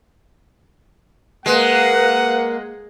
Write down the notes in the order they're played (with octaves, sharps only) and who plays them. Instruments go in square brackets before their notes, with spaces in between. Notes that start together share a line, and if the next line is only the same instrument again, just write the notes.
[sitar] G#3 [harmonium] A#3 [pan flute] B4 [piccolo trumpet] F#5